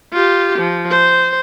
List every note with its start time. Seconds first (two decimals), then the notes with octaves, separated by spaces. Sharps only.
0.13 F4 G4
0.58 F3
0.91 C5